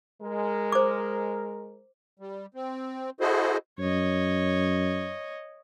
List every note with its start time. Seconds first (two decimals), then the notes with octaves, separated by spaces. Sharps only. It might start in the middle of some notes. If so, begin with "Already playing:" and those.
0.22 G#3 A#4
0.72 C5 D6
2.20 G3
2.54 C4
3.21 E4 F#4 G#4 A4 C5 D#5
3.79 F#2 C#5 D#5